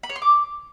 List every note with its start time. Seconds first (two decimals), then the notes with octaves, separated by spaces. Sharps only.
0.03 B5
0.10 C#5
0.16 C6
0.22 D6